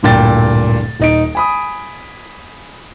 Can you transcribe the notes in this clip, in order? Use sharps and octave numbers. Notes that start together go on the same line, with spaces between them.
D1 G2 A#2 G5 A6
D#1 D#4 D7
G#5 B5 D#6